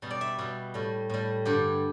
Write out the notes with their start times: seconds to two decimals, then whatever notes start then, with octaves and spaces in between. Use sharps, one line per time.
0.02 B2 G3
0.11 D5
0.21 E5
0.38 B2 G3
0.74 A2 G3
1.10 A2 G3
1.45 G2 D3 G3 G4